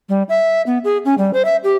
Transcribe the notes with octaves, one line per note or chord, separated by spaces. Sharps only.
G3
E5
B3
G#4
C#4
G3
C5
E5
G4